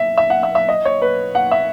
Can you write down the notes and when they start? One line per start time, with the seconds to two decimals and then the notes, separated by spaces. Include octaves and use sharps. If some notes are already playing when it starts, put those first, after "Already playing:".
Already playing: E5
0.18 E5
0.30 F#5
0.43 E5
0.55 E5
0.69 D#5
0.85 C#5
1.02 B4
1.35 F#5
1.51 E5